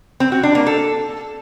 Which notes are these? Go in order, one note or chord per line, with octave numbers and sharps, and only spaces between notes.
C4
F#4
D4
A#3
A4